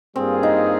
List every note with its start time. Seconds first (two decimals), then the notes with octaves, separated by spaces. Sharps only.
0.16 G2 G3 A#3 C4 F4 G#4
0.43 D#4